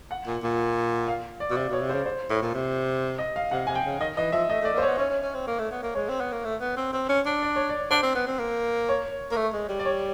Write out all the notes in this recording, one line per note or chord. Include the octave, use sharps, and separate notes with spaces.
F#5
A#2
A#2
F5
D5
B2
C3 D5
B2
C#5
C3
C5
C#3
C5
A2
A#2
C3
D#5
F5
C3 F#5
C3 G#5
G5
C#3
D#3 D#5
E3 D#5
F3 E5
A3 D#5
A3 D5
A#3
C5
C#5
B3
C#4 C#5
C#4
C#4
C4
A#3
A3
B3
A#3
G#3 C#5
C4
B3
A#3
A3
B3
C4
C4
C#4
D4
D5
C#5
D5
D4 C5
C4
B3
C4
A#3
C#5
A#3
A3
G#3
G3
D5
C#5